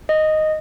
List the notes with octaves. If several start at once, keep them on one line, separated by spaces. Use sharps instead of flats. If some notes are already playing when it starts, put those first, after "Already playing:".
D#5